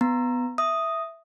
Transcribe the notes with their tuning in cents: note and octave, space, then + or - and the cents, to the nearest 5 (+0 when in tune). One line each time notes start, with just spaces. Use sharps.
B3 +10 A#5 +0
E5 +0 D#6 +0